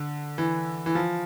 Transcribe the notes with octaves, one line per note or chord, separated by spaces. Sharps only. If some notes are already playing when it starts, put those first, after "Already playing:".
Already playing: D3
E3
E3
F3